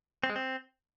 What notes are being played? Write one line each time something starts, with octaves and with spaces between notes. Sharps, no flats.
C4
G#3
C4